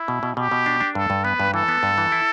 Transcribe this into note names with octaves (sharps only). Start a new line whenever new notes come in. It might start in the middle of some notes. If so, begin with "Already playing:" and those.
Already playing: E4
B2
B2
B2 G4
B2
D4
D4
G2 A4
G2
B3 B4
G2
E3 A4
B3
G2
E3
E4